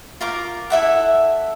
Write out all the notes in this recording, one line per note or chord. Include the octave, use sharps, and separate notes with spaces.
F4 A#4 D6
E4 A4 E5 F#5